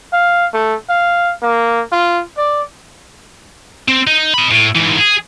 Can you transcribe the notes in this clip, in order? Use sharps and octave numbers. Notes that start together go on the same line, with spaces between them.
F5
A3
F5
A#3
F4
D5
C4
D#4
D#5 B5
A2
G#2 E3
G#4